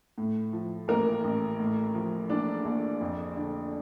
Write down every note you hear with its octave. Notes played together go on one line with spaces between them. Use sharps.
A2
F3
A1 A#3 A#4
A1
A2
F3
A#1 D4 D5
A#1
F2
D3